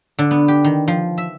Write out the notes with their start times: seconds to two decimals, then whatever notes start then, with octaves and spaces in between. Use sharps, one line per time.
0.19 D3
0.31 B3
0.48 G4
0.64 D#3
0.88 F3
1.18 E5